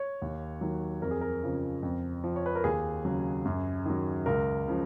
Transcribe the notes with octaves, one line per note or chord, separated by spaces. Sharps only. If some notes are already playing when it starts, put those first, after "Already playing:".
Already playing: C#5
D#2
D#3 F#3
F2 A#4
G#4
A#4
C#3 F3
F2
F3
C#5
B4
A#4
D#2 G#4
C#3 F#3
F#2
D#3 F#3
C#2 A#4
C#3 F3